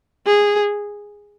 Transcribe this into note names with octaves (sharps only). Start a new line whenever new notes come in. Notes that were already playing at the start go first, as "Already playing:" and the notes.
G#4